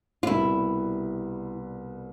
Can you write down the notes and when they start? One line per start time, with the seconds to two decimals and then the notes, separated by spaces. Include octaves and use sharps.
0.23 F4
0.27 C2 B2 G3 B3 E4